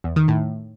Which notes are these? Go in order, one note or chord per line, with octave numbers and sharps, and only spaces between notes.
E2
D#3
A2